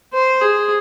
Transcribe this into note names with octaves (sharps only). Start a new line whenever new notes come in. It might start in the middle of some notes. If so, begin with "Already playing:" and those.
C5
G#4